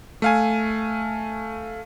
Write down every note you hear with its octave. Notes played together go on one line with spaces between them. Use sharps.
A3 F5 G#5